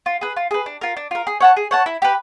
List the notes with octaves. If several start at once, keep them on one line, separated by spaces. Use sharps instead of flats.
F4
G#4 B4
F4
G#4 B4
D4
F4 A#4
D4
F4 A#4
G#4
C#5 F#5 A5
G#4
C#5 F#5 A5
E4
G4 B4